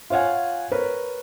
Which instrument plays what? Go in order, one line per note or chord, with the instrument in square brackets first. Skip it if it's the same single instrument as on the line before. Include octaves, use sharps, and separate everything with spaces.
[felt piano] F4 C#5 F5 F#5 G#5
A#4 B4 C#5 B5